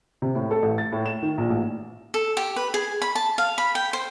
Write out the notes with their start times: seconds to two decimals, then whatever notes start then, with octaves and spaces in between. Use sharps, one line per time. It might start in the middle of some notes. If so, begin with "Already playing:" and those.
0.22 C3
0.35 A2
0.51 A4
0.62 A1
0.78 A6
0.92 A2
1.06 E7
1.22 D#3
1.38 A#1
1.50 A1
2.14 A4
2.37 G4
2.56 B4
2.74 G#4
3.02 B5
3.15 A5
3.38 F5
3.58 B5
3.75 G5
3.93 C5